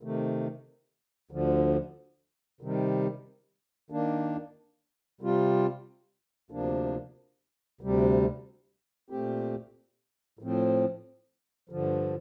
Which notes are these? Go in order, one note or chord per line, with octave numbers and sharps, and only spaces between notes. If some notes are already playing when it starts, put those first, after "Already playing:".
C3 D#3 A3
D2 D3 F3
C3 D#3 G3
D#3 A#3 D4
C3 G3 C4 F4
D2 C3 F3 A#3 D4
D2 C3 G3
A#2 A3 C4 G4
A2 F3 C4
G2 D3 F3